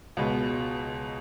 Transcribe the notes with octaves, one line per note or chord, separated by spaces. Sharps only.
C#2 B2 G#3 B3